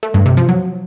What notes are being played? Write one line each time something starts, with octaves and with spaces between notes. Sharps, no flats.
A3
G2
C3
F3
F#3